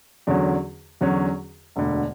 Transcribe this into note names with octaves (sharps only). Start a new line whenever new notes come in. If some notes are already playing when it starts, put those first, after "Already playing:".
E2 D3 F#3 C#4 F#4
E2 D3 F#3 C#4 F#4
E1 D2 D3